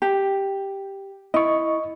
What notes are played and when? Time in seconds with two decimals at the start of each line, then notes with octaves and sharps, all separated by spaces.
0.02 G4
1.34 E4 D#5 C#6